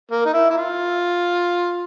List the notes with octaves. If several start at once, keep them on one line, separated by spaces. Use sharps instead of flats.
A#3
D#4
E4
E4
F4